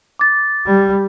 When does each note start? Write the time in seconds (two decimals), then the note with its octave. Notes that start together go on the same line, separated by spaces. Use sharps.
0.19 D6 A6
0.66 G3